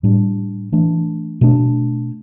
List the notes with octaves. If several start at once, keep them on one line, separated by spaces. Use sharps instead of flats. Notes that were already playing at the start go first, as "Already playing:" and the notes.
A2 G3 D4
E3 A3 D4
B2 A3 D4